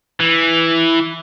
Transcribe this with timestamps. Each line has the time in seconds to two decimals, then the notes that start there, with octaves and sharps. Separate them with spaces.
0.20 E3